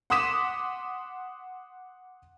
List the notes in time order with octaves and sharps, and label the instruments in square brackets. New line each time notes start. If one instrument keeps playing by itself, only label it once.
[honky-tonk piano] F#5 C6 D6 D#6 B6 E7